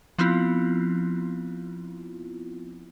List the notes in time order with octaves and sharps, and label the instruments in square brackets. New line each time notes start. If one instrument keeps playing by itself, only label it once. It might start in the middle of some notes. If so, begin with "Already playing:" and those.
[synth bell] F3 B3 C4 E4 F4